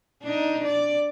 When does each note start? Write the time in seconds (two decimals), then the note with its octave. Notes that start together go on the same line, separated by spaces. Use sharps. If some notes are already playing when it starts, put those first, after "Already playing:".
0.23 D4 D#4
0.64 D5